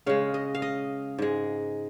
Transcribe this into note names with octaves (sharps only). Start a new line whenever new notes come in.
C#3 G#3 F5
D#5
F5
D#5
G#2 G#3